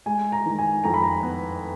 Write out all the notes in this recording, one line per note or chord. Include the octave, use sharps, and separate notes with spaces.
G#3 G#5
A#5
D#3
G#5
F2 A#5
B5
A#5
B3